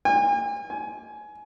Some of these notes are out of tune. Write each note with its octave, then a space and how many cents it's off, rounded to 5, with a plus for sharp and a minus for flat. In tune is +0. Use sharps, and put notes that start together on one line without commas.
G#5 -40
G#5 +20